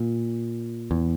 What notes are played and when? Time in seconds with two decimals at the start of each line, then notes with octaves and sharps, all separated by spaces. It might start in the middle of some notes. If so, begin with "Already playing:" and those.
Already playing: A#2
0.91 E2